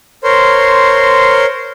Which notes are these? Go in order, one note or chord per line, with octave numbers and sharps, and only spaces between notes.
A#4 C5 C#5 C6